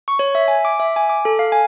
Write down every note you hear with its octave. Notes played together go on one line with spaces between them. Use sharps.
C#6
C#5
E5
G#5
D6
E5
G#5
D6
A4
F5
G#5